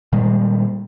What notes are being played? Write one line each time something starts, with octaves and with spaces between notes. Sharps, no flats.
A#2 D#3 G3 G#3